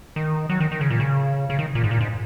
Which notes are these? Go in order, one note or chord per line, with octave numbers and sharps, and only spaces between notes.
D#3
F#3
D#3
D#3
C#3
A#2
C#3
C#3
D#3
A#2
G#2
A#2
G#2